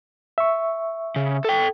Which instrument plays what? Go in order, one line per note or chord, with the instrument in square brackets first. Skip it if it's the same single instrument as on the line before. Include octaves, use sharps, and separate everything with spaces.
[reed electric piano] E5 C#6
[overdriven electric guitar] C#3
A4 G5